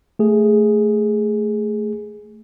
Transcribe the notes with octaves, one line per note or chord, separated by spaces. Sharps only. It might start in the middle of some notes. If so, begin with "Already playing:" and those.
A3 G#4